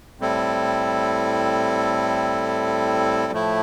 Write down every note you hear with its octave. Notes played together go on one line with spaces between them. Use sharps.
A2 G3 C4 E4 A4
A2 F3 A3 E4